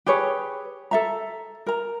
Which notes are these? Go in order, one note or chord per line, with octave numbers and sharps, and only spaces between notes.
G4 G#4 B4 C#5
A4 E5 A#5
A#4 A#5